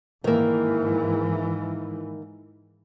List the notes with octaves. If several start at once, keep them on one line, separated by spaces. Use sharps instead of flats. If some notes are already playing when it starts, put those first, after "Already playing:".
G#2 D#3 E3 A#3